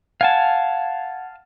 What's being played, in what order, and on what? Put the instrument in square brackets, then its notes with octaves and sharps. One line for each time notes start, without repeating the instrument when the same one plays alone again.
[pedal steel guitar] F5 G#5 A5 [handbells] F#5 G#6